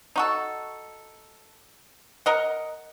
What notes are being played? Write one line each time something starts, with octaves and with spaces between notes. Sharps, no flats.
D#4 F#4 A4
A#4 D#5 F#5